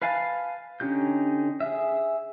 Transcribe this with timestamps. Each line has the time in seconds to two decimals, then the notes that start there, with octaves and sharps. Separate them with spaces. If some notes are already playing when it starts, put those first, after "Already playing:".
0.02 B4 F5 G#5 A5
0.80 D3 C#4 D#4 G4 G6
1.60 G#4 E5